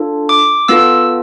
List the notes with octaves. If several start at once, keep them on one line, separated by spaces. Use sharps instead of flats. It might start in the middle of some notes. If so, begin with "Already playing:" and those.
Already playing: D4 F4 A4
D6
B3 F4 A4 E6